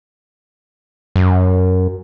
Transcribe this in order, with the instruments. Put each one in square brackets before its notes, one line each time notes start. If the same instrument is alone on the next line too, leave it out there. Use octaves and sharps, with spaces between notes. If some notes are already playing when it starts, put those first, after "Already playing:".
[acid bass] F#2